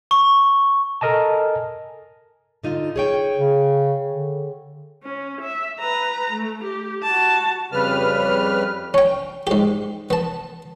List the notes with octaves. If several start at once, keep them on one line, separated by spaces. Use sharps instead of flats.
C#6
A4 A#4 D#5 G#5 A5
D3 D#4 F4
G#4 C#5 G5
C#3
D3
C#4
E5
B4 A#5
A3
G4
F#4 A5
F2 C#3 G3 B4 F6
C#4 G5
G#2 G4
B3 A5